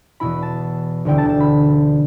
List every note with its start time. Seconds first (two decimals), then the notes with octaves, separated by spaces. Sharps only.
0.20 E2 B2 B3 E4 B5
0.43 A5
1.05 E1 D2 D3 G3 E4 G5
1.18 A5
1.29 A5
1.40 B5